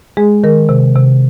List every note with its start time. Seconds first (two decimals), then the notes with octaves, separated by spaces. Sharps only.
0.17 G#3 G#4
0.44 D#3 A#4
0.69 C3
0.96 C3